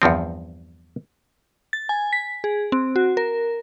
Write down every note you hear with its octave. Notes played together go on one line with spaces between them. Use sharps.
E2 G2 F3 C4
A6
G#5
B6
G#4
C4
F#4
A#4